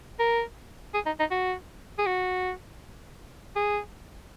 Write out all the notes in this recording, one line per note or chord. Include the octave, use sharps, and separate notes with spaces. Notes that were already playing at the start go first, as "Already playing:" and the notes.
A#4
G#4
D#4
D#4
F#4
G#4
F#4
G#4